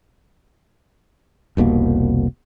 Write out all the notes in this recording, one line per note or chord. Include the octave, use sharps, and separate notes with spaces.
F1 C2 B2 A#3